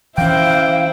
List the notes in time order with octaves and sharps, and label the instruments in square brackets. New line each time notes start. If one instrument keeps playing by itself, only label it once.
[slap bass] E3 C#4 [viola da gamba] E4 C5 [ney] F5 [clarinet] G5